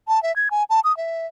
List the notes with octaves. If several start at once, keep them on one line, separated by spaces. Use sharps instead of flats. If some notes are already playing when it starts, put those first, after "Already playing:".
A5
E5
G#6
G#5
A5
D#6
E5